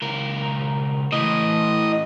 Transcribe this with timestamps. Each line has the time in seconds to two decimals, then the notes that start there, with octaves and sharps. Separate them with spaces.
0.02 C#2 A#4
1.12 A2 E3 D#5